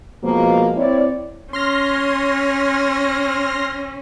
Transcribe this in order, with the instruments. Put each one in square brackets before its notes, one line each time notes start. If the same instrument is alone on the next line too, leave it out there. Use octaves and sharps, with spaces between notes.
[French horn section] B2 F3 G#3 A#3
C4 E4 C#5 D5
[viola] C#4 [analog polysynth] C6 F6 A#6